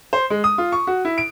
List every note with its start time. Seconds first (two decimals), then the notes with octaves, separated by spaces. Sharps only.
0.13 C5
0.30 G#3
0.44 D#6
0.58 F4
0.72 C#6
0.87 F#4
1.05 E4
1.18 D7